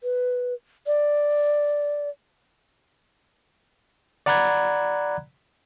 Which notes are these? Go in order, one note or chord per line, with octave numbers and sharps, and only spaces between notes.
B4
D5
D5 F#5 A#5 B5 F#6 G#6